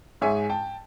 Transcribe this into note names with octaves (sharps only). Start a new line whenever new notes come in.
G#2 G#3 C#5 E5 G#5
G5 A5